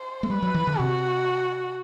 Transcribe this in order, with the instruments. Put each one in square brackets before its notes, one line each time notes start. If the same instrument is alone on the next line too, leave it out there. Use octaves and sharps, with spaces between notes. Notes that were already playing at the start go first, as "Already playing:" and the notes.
Already playing: [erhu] C5
[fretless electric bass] A3
[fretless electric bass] G3 [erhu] B4
[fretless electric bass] F#3
E3
D3
[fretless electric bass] C3 [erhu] F#4